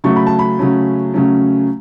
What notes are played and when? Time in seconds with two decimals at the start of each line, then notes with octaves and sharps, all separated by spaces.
0.04 C#3 F#3 A3 C#4 C#6
0.16 B5
0.27 A5
0.39 B5
0.59 C#3 F#3 A3 C#4
1.14 C#3 F#3 A3 C#4